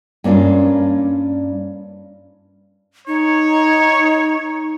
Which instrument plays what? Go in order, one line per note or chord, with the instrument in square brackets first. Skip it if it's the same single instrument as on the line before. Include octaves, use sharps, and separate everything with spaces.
[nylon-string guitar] G2 A#3 C#4 D4 F4
[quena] D#4 [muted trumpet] C#5